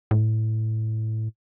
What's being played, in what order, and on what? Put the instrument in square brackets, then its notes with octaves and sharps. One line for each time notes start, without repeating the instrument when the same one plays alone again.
[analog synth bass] A2